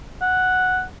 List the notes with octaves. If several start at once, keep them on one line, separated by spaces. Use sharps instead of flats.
F#5